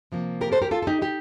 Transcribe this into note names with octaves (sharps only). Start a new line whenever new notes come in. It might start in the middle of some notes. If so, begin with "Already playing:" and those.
C3 F3 A#3
G4 A#4
A4 C5
G4 A#4
F4 A4
A4
D#4 G4
D#4 G4